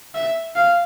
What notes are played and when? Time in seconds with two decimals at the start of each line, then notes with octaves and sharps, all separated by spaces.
0.15 E5
0.55 F5